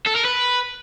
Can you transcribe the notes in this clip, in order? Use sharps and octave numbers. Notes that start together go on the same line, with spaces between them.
A4
A#4
B4